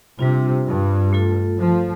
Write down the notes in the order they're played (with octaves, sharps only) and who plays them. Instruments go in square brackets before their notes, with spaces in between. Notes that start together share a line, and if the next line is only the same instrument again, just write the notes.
[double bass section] C3 [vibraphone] G3 D4 F4
[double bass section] G2
[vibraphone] A3 F4 A4
[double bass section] F3